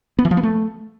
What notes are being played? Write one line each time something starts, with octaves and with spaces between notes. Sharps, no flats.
B3
E3
F3
B3
A3